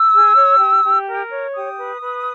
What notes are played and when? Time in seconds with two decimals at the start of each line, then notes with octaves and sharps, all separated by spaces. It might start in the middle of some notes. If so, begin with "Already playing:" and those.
Already playing: E6
0.13 G#4
0.36 C#5
0.60 G4
0.84 G4
1.07 A#4
1.31 C#5
1.54 G4 D#6
1.78 B4
2.01 B4